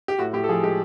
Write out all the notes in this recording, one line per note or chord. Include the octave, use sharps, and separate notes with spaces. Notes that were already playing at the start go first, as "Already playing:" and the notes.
G4
A2 F#4
A2 G4
A4
F3 G#4
G#3 G4